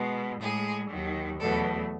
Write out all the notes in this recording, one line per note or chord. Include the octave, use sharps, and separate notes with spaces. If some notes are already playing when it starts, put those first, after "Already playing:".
Already playing: B2 G#3
A2 G#3 G#4
D#2 D#3 F#3
E2 B2 F#3 A3 A4